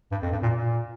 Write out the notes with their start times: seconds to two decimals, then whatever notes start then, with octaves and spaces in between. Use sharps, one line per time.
0.11 G2
0.22 F2
0.32 G2
0.42 A#2
0.53 A#2